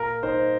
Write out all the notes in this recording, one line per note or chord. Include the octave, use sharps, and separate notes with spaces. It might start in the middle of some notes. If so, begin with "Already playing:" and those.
Already playing: A#2 A#4
D#4 C5